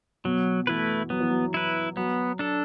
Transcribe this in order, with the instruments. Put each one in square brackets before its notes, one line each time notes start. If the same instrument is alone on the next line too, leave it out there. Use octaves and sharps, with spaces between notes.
[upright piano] B2 [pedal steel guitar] F#3
[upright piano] E3 [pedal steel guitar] A3 E4 B4
[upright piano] F#3 [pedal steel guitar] B3
[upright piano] E3
F#3
[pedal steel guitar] E4 B4
[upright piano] F#3 [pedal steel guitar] B3
[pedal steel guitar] D4 A4